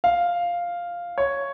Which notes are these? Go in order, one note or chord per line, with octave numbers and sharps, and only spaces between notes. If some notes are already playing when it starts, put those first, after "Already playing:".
F5
C#5